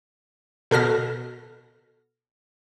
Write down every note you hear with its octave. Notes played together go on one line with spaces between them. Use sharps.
B2 A4 F6 A#6